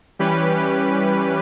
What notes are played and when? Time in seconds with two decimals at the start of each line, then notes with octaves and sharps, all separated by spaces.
0.19 E3 G3 C#4 G4 B4
0.56 G4